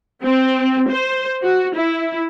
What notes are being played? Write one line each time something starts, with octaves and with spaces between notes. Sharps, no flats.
C4
C5
F#4
E4